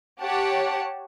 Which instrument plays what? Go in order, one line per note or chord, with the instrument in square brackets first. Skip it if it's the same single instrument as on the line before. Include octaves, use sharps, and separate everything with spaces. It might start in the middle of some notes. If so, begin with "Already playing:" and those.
[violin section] G4 C#5 F#5 A5